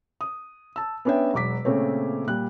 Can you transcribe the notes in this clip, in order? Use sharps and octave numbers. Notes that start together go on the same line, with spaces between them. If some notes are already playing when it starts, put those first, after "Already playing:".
D#6
A5 E6
B3 C#4 D4 C#5 E5 G5
E1 F#3 D6 B6
A#2 C#3 A3 C4 C#5
A#2 G3 F#6